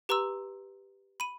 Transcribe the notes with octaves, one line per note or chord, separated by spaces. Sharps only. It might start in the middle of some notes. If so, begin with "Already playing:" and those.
G4 B4 A#5 C6 E6
B5 D#7